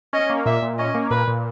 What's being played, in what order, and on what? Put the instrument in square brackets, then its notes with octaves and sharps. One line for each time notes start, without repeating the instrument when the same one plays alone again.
[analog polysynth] C#4 [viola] D#5
[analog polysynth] A#3
[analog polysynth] A#2 [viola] E5
[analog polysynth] A#2
[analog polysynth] C#4 [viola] D#5
[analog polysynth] A#3
[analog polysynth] A#2 [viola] B4
[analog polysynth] A#2